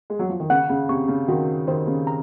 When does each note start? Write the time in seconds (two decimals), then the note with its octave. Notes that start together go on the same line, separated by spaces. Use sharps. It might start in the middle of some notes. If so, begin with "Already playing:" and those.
0.10 G#3
0.19 F#3
0.29 F3
0.40 D#3
0.50 C#3 F#5
0.69 C#3
0.89 C3 C#6
1.08 C#3
1.28 D#3 F#4
1.67 D#3 C5
1.87 C#3
2.07 A#5